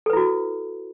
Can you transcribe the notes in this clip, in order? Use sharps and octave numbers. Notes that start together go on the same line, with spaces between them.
E4 F#4 A4 B4